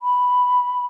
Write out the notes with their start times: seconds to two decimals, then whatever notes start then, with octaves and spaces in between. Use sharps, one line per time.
0.01 B5